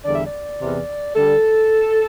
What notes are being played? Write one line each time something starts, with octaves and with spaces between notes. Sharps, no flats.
E2 D3 G3 D5
E5
D5
E2 C3 E3
D3 G3 A4